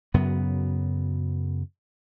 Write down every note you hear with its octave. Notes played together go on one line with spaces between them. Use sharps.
F#2 C#3 F#3 B3